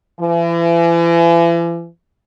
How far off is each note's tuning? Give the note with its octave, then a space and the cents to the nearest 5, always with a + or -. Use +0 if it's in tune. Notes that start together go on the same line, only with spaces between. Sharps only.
E3 +40